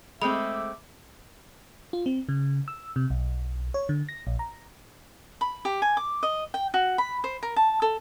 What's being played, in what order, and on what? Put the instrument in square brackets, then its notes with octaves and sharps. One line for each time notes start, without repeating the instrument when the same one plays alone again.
[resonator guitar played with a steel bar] G#3 A3 C4 [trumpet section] E5 D6 [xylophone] B5
[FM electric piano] F4
C4
C#3
E6
C3
B1
C#5
D3
A#6
A#1
A#5
[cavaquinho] B5
G4
G#5
D6
D#5
G5
F#4
B5
C5
A#4
A5
A4